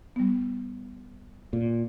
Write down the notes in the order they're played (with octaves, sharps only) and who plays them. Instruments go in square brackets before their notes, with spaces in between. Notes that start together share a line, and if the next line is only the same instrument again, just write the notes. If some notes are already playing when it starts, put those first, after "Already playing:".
[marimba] G3 B3
[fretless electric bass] A#2